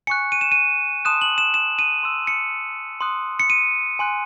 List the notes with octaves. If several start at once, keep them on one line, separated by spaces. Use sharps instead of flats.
G#5 C#6 F#6 C#7
D#7
E7
D#7
A5 C6 D#6 F#6 E7
F#7
E7
E7
D#7
C6 E6
C#7
C6 D#6 F#6
C#7
D#7
G#5 C6 F#6